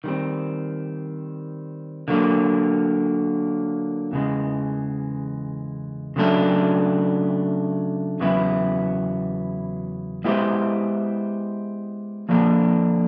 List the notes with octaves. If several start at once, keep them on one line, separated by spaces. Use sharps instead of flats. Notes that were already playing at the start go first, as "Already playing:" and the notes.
D#3 G3 C4
D3 F#3 A#3
E2 C#3 E3 G#3
C#3 F#3 A3 D4
E2 C#3 F#3 B3 E4
G#3 B3 E4 G4 C5
D3 F3 A#3 D4